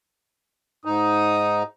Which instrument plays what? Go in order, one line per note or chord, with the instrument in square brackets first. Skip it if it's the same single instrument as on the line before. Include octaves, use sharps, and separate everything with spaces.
[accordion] G#2 D#4 [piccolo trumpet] D#6